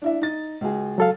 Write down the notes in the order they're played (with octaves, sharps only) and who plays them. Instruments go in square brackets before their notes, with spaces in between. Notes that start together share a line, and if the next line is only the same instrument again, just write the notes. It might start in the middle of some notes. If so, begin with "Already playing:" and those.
[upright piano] D4 E4 E5
D#4 A6
C#2 F#4 G#4
[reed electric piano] F#3 A4 F5